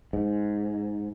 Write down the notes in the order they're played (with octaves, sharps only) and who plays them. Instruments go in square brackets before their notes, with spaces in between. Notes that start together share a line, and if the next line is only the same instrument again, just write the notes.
[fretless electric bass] G#2